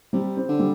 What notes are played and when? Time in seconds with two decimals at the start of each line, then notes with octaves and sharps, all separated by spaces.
0.13 C3 G3
0.37 C4
0.49 D3
0.60 G3